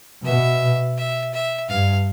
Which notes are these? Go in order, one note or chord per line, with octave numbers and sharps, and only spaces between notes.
B2 E5
E5
E5
G2 F5